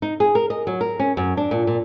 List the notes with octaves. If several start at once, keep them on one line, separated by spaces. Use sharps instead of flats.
D#4
G#4
A#4
D#5
F#3
A#4
C#4
F#2
D4
A#2
A#2